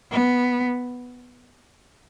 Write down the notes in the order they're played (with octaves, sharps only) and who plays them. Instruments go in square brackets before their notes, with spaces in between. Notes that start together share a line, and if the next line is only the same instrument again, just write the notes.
[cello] B3